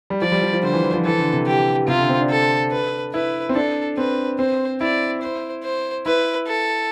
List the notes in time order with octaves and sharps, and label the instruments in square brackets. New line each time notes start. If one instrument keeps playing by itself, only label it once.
[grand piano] G3
[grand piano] F3 [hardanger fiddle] D5
[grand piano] G3
F3
F3
[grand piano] D3 [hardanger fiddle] C5
[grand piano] E3
E3
F3
[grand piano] E3 [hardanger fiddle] A4
[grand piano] D3
C3
[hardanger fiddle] G4
[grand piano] C3 [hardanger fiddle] F4
[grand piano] D3
C4
D4
[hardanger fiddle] A4
B4
[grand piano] E4 [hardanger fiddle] B4
[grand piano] C4
[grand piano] D4 [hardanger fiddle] A4
[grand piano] C4 [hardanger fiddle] B4
[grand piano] C4 [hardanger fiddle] C5
[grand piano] E4 [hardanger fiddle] D5
[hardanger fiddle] C5
C5
[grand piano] E4 [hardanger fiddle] B4
[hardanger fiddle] A4